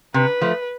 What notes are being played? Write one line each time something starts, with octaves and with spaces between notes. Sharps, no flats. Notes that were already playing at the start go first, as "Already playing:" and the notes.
C3 B4
F3 A3